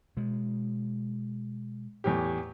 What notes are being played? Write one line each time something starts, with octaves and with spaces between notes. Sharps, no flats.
B2 G#3
E2 A2 G4